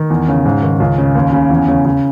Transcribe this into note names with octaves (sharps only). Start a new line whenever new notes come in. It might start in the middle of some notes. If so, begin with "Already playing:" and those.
Already playing: D#3
E2
C#3
G#2
D#3
C#2
C#3
D#2
C#3
E2
C#3
C#3